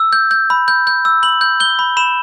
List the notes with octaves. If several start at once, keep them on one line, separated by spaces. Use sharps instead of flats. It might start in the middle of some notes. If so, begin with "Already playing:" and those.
Already playing: E6
G6
G6
B5
G6
G6
E6
B5 F#7
G6
G6 G7
B5
B5 E7